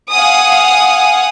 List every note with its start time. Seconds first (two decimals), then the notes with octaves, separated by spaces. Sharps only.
0.12 F5 F#5 G#5 D#6